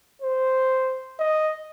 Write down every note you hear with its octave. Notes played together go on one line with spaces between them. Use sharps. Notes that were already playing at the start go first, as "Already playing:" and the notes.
C5
D#5